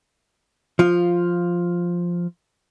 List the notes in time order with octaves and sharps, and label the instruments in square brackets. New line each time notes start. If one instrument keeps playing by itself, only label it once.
[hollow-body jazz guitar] F3 F4